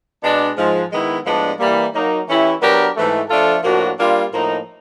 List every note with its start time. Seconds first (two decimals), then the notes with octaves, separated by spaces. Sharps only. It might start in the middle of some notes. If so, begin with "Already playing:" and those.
0.23 B2 G#3 B3 D4
0.57 G#2 F3 G#3
0.91 D#3 G#3 B3 E4
1.25 A2 F3 G#3 B3 D4
1.59 E3 G3 A#3
1.93 F#3 A#3 D#4
2.27 E3 A3 C#4 E4 G4
2.61 F#3 B3 D4 G4 A#4
2.95 G#2 E3 A3
3.29 F3 A3 D4 F4 A4
3.63 A2 F3 A#3 D4 F#4
3.97 G3 A#3 D4 F4
4.31 A2 F3 A#3 D#4